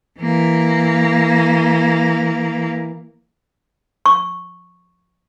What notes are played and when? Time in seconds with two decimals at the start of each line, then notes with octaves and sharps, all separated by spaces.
0.20 E3 A#3
4.06 C#6